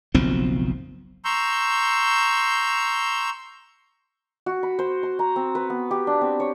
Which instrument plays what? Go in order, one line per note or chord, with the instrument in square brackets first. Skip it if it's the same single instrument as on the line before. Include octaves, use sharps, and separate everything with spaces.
[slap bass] F#1 B1 F3 C4
[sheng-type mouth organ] A#5 C6 C#6 E6 G6
[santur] F#4
B5
C5
C6
A#5
C4
B4
B3
G4
D4
C4
C#5